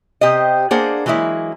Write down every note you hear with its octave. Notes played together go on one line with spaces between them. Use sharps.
C3 G4 C5 D#5
A#3 D4 G#4 A#4 C5 F#5
E3 F#3 G#3 A#3 E4